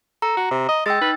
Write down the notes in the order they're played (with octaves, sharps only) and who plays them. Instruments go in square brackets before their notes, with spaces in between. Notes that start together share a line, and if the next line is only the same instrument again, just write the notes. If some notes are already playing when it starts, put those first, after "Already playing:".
[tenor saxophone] A4 [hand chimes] A#5
[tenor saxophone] F#4
C3
D#5
[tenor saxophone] G#3 [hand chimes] G5 E6 A6
[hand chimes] D#4 [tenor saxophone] B4